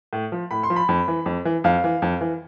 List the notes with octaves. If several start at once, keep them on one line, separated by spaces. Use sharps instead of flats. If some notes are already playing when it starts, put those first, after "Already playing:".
A2
F3
A2 B5
C6
F3
B5
F2
E3
F2
E3
F2 F5
E3
F2
E3